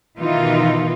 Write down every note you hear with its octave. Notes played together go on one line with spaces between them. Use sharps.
B2 D#3 E3 D#4 F4